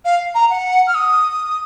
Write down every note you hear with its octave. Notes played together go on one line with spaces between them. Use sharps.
F5
A#5
F#5
F6
D#6